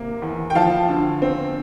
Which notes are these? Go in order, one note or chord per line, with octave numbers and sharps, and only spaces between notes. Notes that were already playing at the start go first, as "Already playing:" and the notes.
Already playing: C3 A#3
E2
G5
F3 F5 A5
D3
C4